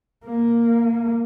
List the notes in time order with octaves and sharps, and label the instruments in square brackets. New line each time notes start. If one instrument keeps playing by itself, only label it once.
[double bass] A#3